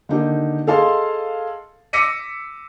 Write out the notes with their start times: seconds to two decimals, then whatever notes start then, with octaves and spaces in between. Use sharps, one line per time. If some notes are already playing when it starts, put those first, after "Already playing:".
0.09 D3 D#3 A#3 D#4 G4
0.67 G#4 A4 D#5 F5 A5 C6
1.93 D6 E6 A#6 B6 C#7 D#7